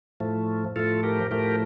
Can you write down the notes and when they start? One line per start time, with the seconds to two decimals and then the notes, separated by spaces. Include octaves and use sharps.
0.20 A2 F3 A3
0.76 A2 F3 A3 F4 A4
1.03 G4 A#4
1.31 A2 F3 A3 G4 A#4